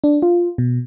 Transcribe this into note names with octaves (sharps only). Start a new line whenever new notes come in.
D4
F4
B2